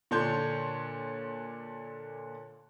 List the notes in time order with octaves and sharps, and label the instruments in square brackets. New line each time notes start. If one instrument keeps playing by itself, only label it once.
[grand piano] A#2 D3 D4 C#5 C6 G6